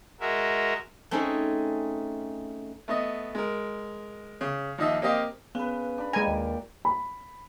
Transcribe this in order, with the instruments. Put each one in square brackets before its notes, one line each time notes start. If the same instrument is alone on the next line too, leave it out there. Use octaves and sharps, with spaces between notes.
[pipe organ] G#3 F#4 A#4 E5
[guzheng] A3 C4 C#4 D#4 G#4 A4
[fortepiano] A3 B3 D#5
G#3 A#4
C#3
D#2 F3 D#4 D#5 E5
A#3 C4 G4 D#5 F5
[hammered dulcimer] C#3 B4 [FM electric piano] B3
[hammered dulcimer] D4 B5
[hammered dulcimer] A#2 G4 A#4 [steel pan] G#3 G#5
[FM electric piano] D#2
[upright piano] B5